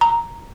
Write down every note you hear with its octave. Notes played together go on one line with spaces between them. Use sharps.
A#5